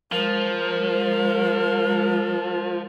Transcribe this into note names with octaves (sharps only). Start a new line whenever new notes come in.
F3 G#3 A#4